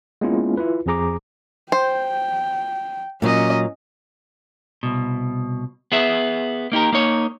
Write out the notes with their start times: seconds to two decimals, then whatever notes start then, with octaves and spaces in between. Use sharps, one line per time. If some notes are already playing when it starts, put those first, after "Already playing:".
0.21 G#3 A#3 B3 C#4 E4 F4
0.57 E4 F4 B4
0.86 F2 F3 G#4 A#5 D6
1.72 C5 G5
3.22 A#2 F#3 C#4 D#5
4.83 C2 B2
5.92 B3 G#4 E5
6.72 A#3 D#4 G4 A#4
6.93 A#3 D#4 C#5